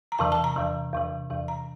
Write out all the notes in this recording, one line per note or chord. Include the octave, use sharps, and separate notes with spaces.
A#5
E2 C3 E3 A5
A5
A#5
E2 C3 E3
E2 C3 E3
E2 C3 E3
A#5